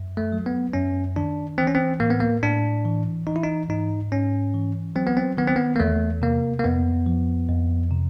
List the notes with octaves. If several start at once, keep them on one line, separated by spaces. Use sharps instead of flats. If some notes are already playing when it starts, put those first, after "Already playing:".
Already playing: F#2
A3
F#3
B3
F#2 C#4
D#3 D4
E3 C4
C#4
C4
A2 A#3
B3
A#3
A2 D4
E3
E3 D#4
E4
D#4
G#2 D#4
G#2 C#4
E3
F#3 C4
B3
C4
D#3 B3
C4
B3
A#3
E2 A3
C3 A#3
A#3
F2 B3
F3
F2
C3